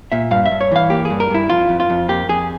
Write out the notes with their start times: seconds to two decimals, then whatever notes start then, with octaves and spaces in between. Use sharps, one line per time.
0.12 A#2 E5
0.31 G2 F5
0.46 E5
0.51 G2
0.61 C#5
0.71 E3 F5
0.90 A#3 G4
1.05 G#4
1.10 G2
1.20 A#4
1.30 G2 E4
1.49 F2 F4
1.69 F2
1.80 F4
1.90 F2
2.09 A#3 G4
2.29 F2 G#4